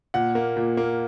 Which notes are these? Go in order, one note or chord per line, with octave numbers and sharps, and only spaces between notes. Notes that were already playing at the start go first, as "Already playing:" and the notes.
A#2 F#5
A#3
A#2
A#3